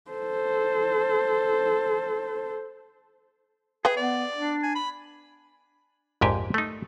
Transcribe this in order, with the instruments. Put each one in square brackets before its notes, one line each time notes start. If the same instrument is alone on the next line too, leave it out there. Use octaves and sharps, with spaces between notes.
[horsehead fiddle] A4 C5
[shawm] G#4 [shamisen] B4 E5 G5
[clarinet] B3 [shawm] D5
[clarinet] D4
[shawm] G#5
B5
[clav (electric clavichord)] A#1 F2 G#2 G4 G#5
A3 D#4